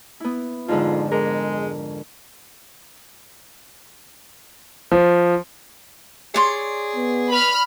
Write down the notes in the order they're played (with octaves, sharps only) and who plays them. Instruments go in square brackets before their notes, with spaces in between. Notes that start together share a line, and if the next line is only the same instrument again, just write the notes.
[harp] B3 E4
[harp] F2 G#2 D3 [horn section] D#4 F4
[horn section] G#3 [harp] D4 A#4
[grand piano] F3
[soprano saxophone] G#4 [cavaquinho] C#5 D5 C6
[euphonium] B3
[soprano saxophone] B4 [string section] B5 F6